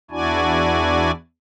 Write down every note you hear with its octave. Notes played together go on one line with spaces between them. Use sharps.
E2 D4 E4 F#4 D5 G#5